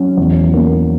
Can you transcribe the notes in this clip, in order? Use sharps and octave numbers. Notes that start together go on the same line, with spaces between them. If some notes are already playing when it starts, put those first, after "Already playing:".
Already playing: F#3 C#4
E2
A#3